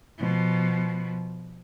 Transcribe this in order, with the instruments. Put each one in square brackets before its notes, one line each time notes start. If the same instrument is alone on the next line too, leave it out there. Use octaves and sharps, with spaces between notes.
[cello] B2 F3